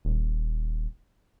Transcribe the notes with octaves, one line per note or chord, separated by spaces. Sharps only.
D#1